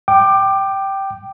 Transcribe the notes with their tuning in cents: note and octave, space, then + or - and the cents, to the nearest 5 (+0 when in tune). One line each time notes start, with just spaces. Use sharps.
G5 -10 D6 +20